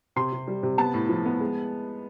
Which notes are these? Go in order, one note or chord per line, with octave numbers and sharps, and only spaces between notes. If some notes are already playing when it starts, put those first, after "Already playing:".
C3 C6
C3
G3
C3
B3 A5
A2
F3
B3
G#3